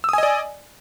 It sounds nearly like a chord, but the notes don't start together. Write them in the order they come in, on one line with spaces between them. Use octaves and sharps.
E6 D#6 G#5 D#5 D5